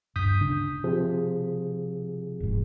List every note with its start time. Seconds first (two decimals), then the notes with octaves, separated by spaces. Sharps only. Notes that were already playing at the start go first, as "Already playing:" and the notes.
0.16 D1 G2 D#6 G6 B6
0.41 C#3 D4
0.84 C3 F3 G#4
2.40 E1 G#2